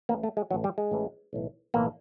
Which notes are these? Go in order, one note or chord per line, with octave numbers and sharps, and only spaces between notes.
A1 A2 E3 A#3
A3
G#3
A1 A2 E3 F#3
G3
G#3
A1 A2 E3
B1 A2 E3
B1 A2 E3 A#3